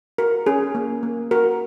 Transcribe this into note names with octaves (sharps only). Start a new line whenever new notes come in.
F#4 A#4
C#4 G#4
A#3
A#3
F#4 A#4